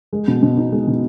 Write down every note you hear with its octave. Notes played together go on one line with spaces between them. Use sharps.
G#3
B2
B2
D#4
G#3
B2